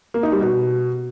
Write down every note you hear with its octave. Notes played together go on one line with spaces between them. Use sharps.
A#3
D#4
G3
B2